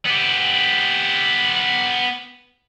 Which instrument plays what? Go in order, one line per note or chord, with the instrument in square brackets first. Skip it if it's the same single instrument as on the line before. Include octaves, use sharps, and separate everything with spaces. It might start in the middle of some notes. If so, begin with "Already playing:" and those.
[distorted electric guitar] B3 G4